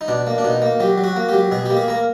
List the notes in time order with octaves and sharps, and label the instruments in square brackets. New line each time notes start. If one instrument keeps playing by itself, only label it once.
[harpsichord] D#4
B2 D4
A#3
D4
B2 D#4
A#3
F#3 G4
F#3
F#4
A#3
F#3 G4
B2 G#4
A#3 G4
G#4
A#3 A#4